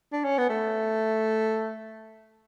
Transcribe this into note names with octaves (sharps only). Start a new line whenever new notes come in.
D4
C#4
B3
A3